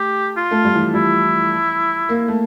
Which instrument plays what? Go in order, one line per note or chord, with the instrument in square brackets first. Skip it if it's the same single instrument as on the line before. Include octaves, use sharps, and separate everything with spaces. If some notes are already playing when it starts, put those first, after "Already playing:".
Already playing: [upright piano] A3 [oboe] G4
[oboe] F4
[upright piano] A3
G3
E3
F3
[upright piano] G3 [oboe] E4
[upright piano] A#3
A3